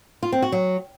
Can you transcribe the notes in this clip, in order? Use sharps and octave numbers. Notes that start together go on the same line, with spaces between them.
F4
C4
F#4
F#3